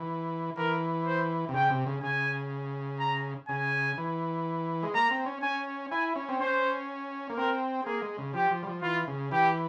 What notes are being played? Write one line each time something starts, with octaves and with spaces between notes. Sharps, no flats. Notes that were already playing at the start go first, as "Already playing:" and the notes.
Already playing: E3
E3 A#4
C5
C3
C#3 G5
C3
C#3
C#3 G#5
A#5
C#3 G#5
E3
G#3
A#3 A#5
C4
C#4
C#4 G#5
E4 G#5
C#4
C4
C#4 C5
A#3
C4 A#4
A#3 G#4
G#3
C#3
F3 G4
F3
G3
F3
E3 F4
C#3
E3 G4